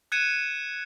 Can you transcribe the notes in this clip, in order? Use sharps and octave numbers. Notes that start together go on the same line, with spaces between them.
F#6 G#6 C#7 D#7 E7